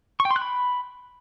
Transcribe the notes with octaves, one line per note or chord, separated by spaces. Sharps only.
C#6
G5
C6
F#6
B5